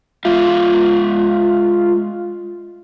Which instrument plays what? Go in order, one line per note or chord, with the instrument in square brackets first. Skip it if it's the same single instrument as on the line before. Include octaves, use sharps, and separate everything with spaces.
[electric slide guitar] G#3 E5 F5 [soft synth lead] F4